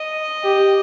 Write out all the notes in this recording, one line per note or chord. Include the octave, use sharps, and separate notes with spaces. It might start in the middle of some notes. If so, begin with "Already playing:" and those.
Already playing: D#5
G4